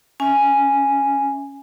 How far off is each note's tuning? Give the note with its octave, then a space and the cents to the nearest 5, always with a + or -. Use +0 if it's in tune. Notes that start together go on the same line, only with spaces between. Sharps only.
C#4 +0 E5 +0 G#5 +0